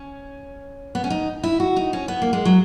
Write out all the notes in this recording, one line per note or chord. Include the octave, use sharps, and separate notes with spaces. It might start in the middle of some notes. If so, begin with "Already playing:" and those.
Already playing: C#4
B3
C#4
D#4
E4
F#4
D#4
C#4
B3
A#3
G#3
F#3